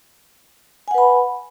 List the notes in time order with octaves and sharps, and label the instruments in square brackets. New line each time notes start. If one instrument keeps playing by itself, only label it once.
[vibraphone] G#5
F#5
B4
B5